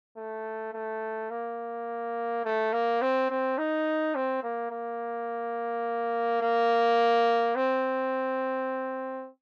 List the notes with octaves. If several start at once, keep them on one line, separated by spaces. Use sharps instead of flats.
A3
A3
A#3
A3
A#3
C4
C4
D#4
C4
A#3
A#3
A#3
C4